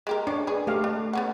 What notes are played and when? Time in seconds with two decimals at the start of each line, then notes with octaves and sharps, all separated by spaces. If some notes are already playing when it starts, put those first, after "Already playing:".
0.07 G#3 G4 A#4
0.27 D4 C#5 D5
0.47 G#4 B4
0.67 A3 G4 F5
0.84 D4
1.13 B3 C#4 F#5